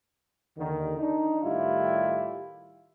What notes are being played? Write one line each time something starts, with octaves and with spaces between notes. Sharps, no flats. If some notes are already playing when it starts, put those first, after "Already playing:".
D#2 D3 D#3
D4 D#4
A2 D#3 G3 E4 F4 G4